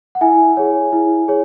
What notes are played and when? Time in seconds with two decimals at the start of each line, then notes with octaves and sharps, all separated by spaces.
0.15 F#5
0.21 E4 E5 G#5
0.57 G#4 C#5
0.93 E4
1.28 G#4 C#5